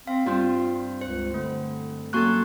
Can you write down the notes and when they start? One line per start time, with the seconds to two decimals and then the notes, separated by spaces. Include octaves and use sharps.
0.07 C4 F5
0.26 G2 C4 F4
1.01 C#2 C5
1.34 D3 A3
2.13 F#3 A#3 C#4 F#4 A4 C#6 F#6